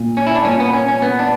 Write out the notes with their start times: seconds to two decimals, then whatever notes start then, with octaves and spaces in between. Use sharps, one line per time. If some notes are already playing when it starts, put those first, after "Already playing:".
Already playing: A#2
0.17 C#4
0.27 E4
0.35 D4
0.45 A#2 C#4
0.60 B3
0.73 C#4
0.88 C#4
1.02 B3
1.19 D4